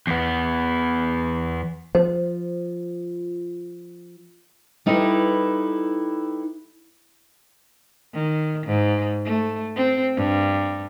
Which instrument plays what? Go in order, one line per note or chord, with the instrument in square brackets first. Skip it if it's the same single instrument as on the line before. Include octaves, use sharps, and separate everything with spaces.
[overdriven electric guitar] E2 B3
[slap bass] F3 [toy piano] C5
[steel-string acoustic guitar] G3 D#4 E4 A4 B4
[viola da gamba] D#3
G#2
A3
C4
G2